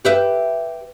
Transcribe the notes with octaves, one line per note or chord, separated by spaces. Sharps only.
G4 B4 E5